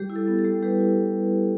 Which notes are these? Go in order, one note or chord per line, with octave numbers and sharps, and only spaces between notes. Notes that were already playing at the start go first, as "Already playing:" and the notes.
Already playing: G3 G4
E4
A4
B3
A4
G3
G3 G4 B4
E4